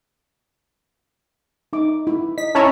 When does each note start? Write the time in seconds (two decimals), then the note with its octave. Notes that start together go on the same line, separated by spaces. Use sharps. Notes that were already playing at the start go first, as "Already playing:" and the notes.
1.73 D#4 E5 D6
2.07 E4
2.38 D#5 B6
2.55 C#4 E4 C#5 A5 A#5